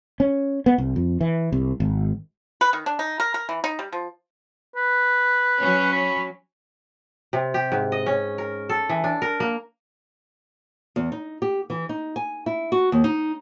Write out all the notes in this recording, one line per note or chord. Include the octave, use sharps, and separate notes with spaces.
C#4
B3
C2
F2
E3
C2
G#1
B4
D#3
D4
D#4
A#4
A#4
E3
D#4
G3
F3
B4
F#3 C#4
B5
C3
G4
G#2
D#5
C#4
A#4
A4
E3
D4
A#4
A#3
E2
D#4
G4
E3
D#4
G#5
E4
F#4
D#2
D#4